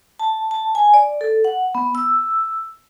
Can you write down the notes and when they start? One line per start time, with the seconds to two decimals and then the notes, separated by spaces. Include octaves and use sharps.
0.19 A5
0.51 A5
0.75 G#5
0.94 D5
1.21 A4
1.45 F#5
1.75 B3
1.95 E6